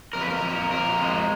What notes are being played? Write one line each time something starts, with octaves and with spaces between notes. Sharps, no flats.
F2 A#4
B4
A#4
F2
F2 A#4
G#3